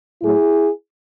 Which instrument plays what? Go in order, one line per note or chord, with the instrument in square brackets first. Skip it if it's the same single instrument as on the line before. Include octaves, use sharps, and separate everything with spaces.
[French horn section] A2 F#3 A3 E4 G#4